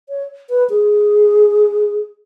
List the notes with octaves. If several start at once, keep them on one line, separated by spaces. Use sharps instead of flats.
C#5
B4
G#4